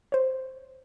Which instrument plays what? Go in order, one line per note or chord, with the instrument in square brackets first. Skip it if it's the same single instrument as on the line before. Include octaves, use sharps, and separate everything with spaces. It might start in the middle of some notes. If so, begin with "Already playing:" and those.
[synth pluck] C5 C#5